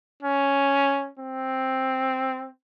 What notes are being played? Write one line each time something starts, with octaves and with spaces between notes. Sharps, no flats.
C#4
C4